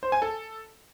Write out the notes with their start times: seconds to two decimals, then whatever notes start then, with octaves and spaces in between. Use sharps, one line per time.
0.03 C5
0.12 G#5
0.22 A4